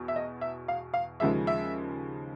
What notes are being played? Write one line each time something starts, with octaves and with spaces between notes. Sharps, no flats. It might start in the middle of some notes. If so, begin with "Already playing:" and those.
Already playing: E2 B2
E5
D#5
E5
F5
F5
D#2 C#3 F3 G#3 E5
E5